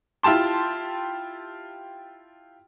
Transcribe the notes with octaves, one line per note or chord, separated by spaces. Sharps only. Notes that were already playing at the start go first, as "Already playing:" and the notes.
E4 F4 G4 A5 C6